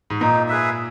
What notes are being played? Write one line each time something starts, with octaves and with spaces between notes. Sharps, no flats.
G#2
A#2 D#4
G#4 B4 E5